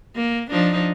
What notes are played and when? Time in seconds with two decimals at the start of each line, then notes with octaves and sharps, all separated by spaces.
0.15 A#3
0.50 F3 D4 D#4